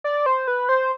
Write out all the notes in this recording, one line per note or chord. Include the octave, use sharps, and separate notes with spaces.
D5
C5
B4
C5